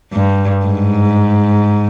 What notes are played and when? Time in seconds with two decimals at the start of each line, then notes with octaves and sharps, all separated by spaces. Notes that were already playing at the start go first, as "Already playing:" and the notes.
0.13 G2
0.66 G#2